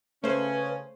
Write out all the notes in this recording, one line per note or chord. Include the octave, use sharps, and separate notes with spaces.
C#3 A3 C#4 B4 C5